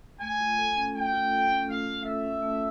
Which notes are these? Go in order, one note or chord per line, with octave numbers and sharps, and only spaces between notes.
A3 G#5
F4
A4
C#4
A3 G5
F4
A4
C#4
A3 F5
F4
A4 E5
C#4
A3